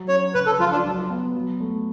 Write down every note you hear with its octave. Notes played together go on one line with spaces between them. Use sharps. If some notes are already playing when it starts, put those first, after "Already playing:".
Already playing: F#3
C#4 C#5
C#3 B4
A4
F3 F4
D4
F#3
B3
F#3
A3